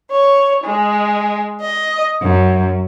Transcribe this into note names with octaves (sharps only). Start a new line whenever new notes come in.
C#5
G#3
D#5
F#2